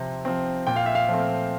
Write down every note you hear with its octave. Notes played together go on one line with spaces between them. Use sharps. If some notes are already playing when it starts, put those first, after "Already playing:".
Already playing: C3 F3 C4
F3 C4
A#2 G5
F5
E5
F5
F3 A3 C4